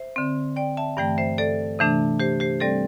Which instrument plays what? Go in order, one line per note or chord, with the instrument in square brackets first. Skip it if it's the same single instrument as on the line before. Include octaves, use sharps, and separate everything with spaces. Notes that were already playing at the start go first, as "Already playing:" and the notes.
Already playing: [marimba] C5 E5
D3 C4
D5 G5
E5 A5
G2 E3 A3 D5 G5
C5 E5
A4 D5
C3 E3 A3 D4
G4 C5
G4 C5
G3 C4 A4 D5